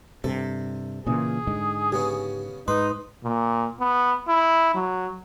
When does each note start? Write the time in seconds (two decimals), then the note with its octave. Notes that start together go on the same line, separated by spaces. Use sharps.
0.24 G2 C3 A4
1.07 A#2 C#3 E3 G#4
1.47 G#2 D3 G#3
1.92 C#3 B3 C#4 G4
2.68 G#2 D#4 B4 C6
3.24 A#2
3.80 B3
4.28 E4
4.75 F#3